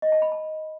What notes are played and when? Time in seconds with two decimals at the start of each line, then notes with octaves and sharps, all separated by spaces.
0.02 D#5
0.12 A5
0.22 B5
0.32 A5